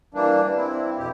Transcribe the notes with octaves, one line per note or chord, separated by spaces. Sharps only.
E3 G3 A#3 D4
C4 E4
F2 B2 G4